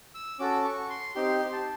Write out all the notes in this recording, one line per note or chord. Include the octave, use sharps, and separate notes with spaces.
E6
C#4 F#4 A4 D6
C#6
C6
C4 D#4 G4 C6
A5